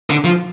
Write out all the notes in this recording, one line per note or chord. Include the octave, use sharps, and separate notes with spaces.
D3
F3